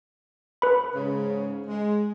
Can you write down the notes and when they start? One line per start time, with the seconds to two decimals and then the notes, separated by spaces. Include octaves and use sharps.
0.62 B4 B5
0.94 G#2 C#3
1.67 G#3